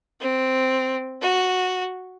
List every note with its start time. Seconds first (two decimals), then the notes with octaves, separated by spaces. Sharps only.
0.21 C4
1.22 F#4